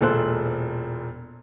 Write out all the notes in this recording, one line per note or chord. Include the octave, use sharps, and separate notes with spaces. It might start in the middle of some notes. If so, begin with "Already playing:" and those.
E1 A#2 A4 C5 F#6